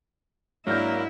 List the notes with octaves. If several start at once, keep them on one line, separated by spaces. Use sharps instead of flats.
G#2 F#3 A#3 D4 E4 A#4 G6